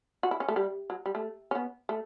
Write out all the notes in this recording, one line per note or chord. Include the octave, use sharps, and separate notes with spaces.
F#4
E4
C#4
A3
G3
F#3
G3
A3
C#4
B3
A3